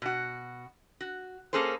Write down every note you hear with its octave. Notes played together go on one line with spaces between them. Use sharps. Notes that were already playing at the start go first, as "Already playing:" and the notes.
B2 F#4
F#4
A#3 C#4 G#4 A4 C5